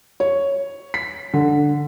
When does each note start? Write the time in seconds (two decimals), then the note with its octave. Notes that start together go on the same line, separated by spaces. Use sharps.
0.20 C#5
0.94 B6
1.34 D3